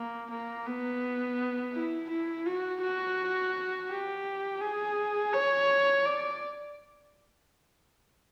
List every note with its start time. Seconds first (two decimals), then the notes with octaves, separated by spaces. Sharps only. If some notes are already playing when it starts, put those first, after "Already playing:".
Already playing: A#3
0.30 A#3
0.66 B3
1.74 E4
2.10 E4
2.46 F#4
2.82 F#4
3.90 G4
4.61 G#4
5.33 C#5
6.05 D5